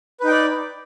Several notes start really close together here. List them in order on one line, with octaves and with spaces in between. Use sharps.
B4 D#4 G5 D5